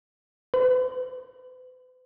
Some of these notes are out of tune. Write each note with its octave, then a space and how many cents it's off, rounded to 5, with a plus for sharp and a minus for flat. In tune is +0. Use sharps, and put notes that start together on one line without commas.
B4 +45